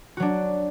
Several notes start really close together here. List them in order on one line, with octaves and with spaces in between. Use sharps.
F#4 F#3 D4